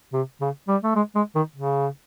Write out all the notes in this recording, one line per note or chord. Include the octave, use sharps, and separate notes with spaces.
C3
C#3
G3
A3
G#3
G#3
D#3
C#3